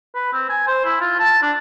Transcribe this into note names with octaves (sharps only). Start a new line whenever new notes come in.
B4
C4
G#5
C5
E4
F4
A5
D4